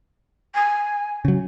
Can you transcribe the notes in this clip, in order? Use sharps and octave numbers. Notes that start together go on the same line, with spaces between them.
G#5
C#3 F#3